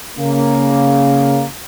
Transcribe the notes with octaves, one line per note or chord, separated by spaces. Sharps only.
C#3 A#3